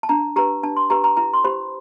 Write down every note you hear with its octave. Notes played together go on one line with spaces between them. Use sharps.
A5
D4 A#5
G4 B4 A#5
D4 A5
C6
G4 B4 A#5
A#5
E4 A#5
C6
G4 C5 B5